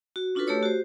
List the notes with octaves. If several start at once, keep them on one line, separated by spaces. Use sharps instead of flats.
F#4
C#4 D4 F4 F#4 A4 B4
A3 G4 A4 C#5 E6
F#4 G4 C5